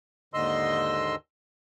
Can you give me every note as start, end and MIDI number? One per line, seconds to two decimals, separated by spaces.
0.34 1.15 39
0.34 1.15 44
0.34 1.15 50
0.34 1.15 75
0.34 1.15 84
0.34 1.15 88